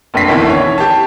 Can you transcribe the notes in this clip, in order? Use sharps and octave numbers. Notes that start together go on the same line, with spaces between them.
F1 A#1 G2 B6 C7
A#1 F2 B2 D#3 E3
C#5
G4 A5